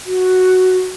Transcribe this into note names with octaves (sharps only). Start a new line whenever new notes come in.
F#4